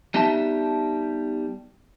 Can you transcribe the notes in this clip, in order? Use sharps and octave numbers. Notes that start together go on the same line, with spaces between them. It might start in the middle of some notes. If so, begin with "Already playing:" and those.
G3 B3 D#4 G4 E5 A5